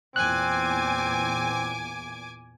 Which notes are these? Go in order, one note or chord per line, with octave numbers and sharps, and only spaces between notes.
E2 A#2 C4 G#5 D6 F#6